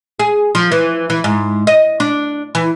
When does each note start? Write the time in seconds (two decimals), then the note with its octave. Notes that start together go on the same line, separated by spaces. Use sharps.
0.20 G#4
0.55 F3
0.72 E3
1.10 E3
1.24 G#2
1.67 D#5
2.00 D4
2.55 E3